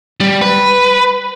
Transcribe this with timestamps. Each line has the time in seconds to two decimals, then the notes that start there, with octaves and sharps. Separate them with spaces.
0.21 G3
0.42 B4